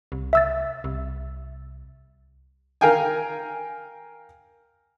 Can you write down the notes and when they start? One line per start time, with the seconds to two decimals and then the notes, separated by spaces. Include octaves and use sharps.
0.12 C2
0.33 E5 E6 A6
0.84 C2
2.81 A#4 F5 G5 G#5